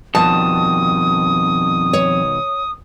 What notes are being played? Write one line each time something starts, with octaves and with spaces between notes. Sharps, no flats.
F2 B2 D#3 G3 A5 D#6
C#5